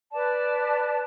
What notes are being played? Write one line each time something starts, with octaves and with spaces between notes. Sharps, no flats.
B4 D5 A5